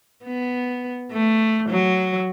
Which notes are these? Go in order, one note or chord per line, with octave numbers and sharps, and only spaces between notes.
B3
A3
F#3